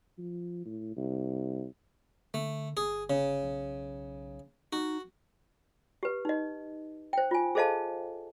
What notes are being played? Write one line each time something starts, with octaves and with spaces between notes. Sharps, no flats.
F3
A2
C2
D3 A3
G1 G#4
C#3
B1
D#4 F#4
G4 B4
D#4 D#5
C5 G5
F4 G#5
G#4 A4 C5 D#5 F5 A5